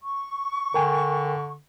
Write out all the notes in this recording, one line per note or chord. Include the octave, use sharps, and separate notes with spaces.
C#6
D3 A#4 G5 G#5